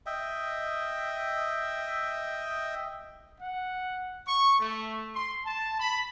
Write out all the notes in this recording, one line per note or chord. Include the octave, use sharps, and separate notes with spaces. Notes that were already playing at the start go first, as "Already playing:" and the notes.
D#5 E5 G5
F#5
C#6
A3
C6
A5
B5